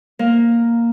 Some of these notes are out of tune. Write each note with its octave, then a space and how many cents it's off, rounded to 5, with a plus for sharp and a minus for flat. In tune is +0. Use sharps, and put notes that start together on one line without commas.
A#3 +0 A#4 +0